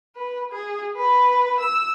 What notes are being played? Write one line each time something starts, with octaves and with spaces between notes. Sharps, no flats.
B4
G#4
B4
E6